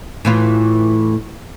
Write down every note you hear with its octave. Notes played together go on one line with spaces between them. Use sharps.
A2 E3 F4